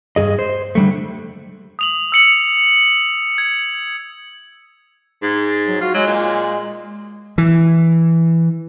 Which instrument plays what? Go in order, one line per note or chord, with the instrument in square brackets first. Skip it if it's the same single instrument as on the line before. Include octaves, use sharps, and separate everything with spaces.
[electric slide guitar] G2 C#3 G#4 D#5
C5
D3 G3 A3
[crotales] D#6 F7 F#7
E6 C#7 F#7
G#6
[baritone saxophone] G#2
[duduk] F#3
[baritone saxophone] F4 [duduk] F#4
[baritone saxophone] F#3 [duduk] G#3
[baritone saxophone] A#2
[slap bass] E3